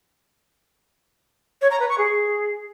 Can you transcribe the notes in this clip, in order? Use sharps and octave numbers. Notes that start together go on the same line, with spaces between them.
C#5
A#5
B4
C#6
G#4